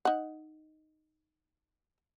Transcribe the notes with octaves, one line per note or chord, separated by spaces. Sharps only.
D#4 F#5